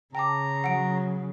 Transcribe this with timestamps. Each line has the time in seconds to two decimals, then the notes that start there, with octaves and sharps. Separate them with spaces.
0.15 C#3 G5 A5 A#5 D6
0.64 F#3 F#5 D7